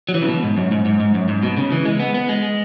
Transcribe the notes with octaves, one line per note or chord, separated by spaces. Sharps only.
F#3
E3
C#3
B2
G#2
F#2
G#2
G#2
G#2
F#2
G#2
B2
C#3
E3
G#3
B3
B3
G#3